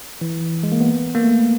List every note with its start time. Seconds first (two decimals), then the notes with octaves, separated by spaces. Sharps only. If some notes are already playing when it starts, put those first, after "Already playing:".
0.21 E3
0.63 G#3
0.72 A#3
0.81 B3
1.15 A#3
1.23 A3